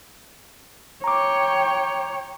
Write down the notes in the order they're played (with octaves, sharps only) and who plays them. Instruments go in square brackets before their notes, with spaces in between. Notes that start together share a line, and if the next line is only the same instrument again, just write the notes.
[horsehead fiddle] C#5 G5 [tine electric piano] A#5 D6